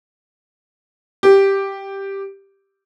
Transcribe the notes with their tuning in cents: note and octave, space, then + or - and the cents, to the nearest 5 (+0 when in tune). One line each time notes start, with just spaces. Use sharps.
G4 +0